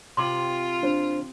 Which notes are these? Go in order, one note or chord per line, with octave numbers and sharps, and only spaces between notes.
C3 F4 C6 D6
D4 C5